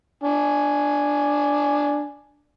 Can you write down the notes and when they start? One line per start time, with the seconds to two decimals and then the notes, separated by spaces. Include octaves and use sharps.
0.24 D4 G#5